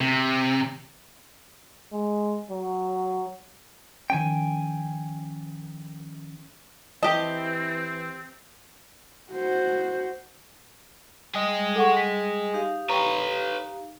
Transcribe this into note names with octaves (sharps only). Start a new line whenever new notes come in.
C3
G#3
F#3
D#3 F3 C#4 G5 G#5
E3 C4 G4 D#5 A5
F#4 C5
G3 G#4 D#5
A4 F#5 C#6
B6
D#4 G4 F5
B4 C#5 G5 A#5